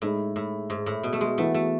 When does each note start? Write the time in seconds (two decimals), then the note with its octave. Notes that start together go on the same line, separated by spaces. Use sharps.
0.02 A2 G#3 D#4 G#4
0.36 A2
0.70 G#2
0.86 A2
1.03 B2
1.13 A3
1.21 G#3
1.38 E3 A3 B3 F#4
1.54 A3